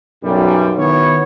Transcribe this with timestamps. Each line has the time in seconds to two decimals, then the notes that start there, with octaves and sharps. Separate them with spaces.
0.24 B1 F#2 G3
0.78 D#3 B3 E4 C#5